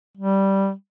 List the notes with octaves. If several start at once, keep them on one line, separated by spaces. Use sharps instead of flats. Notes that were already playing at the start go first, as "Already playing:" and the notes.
G3